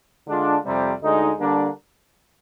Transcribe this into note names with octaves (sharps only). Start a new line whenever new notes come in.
D3 G#3 D4 F4
F2 C3 G3
D2 D3 G#3 D#4
D3 G3 A#3 D4